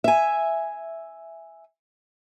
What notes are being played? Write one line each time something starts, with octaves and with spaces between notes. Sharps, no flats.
E5 G#5